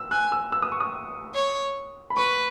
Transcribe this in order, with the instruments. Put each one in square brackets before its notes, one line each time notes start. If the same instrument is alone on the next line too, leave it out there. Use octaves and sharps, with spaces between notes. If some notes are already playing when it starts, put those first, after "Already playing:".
Already playing: [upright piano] E6
[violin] G#5 [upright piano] F#6
[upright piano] E6
E6
D#6
C#6
D#6
[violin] C#5
[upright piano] B5
[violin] B4 [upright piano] C#6